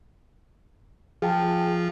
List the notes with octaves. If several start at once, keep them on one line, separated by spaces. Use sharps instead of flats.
F3 G#4 G5 A5